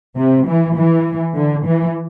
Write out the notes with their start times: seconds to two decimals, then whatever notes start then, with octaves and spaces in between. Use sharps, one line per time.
0.16 C3
0.47 E3
0.76 E3
1.35 D3
1.66 E3